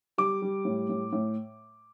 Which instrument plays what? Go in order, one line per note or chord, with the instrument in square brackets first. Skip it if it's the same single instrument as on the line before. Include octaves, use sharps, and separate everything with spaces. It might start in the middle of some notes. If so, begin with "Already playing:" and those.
[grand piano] G3 D6
G3
A2
A2
A2